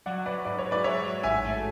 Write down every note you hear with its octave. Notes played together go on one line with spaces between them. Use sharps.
F#3 D5 F#5
F#3 B4 D5
G#2 B4 D5
C#5
G#2
B4 D5
F#3 C#5 E5
F#3
A1 E5 G#5
A3